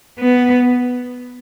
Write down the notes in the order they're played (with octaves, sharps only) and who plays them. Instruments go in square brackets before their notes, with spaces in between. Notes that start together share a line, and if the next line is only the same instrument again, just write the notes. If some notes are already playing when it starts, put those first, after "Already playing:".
[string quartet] B3